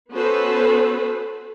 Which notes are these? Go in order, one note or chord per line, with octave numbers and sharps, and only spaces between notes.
B3 C#4 F#4 A4 B4 C5